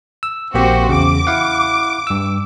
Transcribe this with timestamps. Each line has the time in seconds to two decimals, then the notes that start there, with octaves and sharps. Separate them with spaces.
0.23 E6
0.54 A#1 A#3 C4 F#4 G4 C5
0.89 E2 C#3 D6
1.27 E4 F5 F#5
2.07 G2 E6